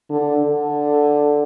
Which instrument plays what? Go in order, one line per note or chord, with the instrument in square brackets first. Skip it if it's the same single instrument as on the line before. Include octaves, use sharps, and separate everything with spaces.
[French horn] D3
D3